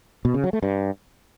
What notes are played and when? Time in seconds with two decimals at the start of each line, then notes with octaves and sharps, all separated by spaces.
0.25 B2
0.34 C#3
0.44 F#3
0.53 A3
0.63 G2